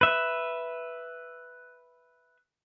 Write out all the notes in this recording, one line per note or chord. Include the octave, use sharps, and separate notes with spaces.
B4 E5